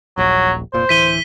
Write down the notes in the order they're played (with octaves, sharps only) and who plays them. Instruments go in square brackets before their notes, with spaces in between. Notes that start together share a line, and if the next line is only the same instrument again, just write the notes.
[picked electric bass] D#1 A#1 [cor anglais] F#3
[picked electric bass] F1 A#2 [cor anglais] C5
[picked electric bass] D1 E3 [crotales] B6 D#7 G7